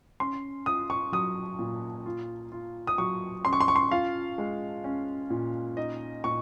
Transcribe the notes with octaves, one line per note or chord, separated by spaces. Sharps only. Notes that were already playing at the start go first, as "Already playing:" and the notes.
C#4 C6
F4 D#6
C#6
F#3 D#6
A#2
F4
F4
D#6
F#3 C#6
C#4 C6
C#6
C6
C#6
C6
F4 F5
G#3
C#4
A#2
D#4 D#5
A#2 C#6